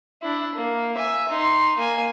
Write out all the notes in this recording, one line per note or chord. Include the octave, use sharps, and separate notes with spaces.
D4 E4
A#3
E5 G#5
D#4 C6
A#3 G#5